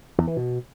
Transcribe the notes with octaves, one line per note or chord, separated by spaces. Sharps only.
E2
E3
B2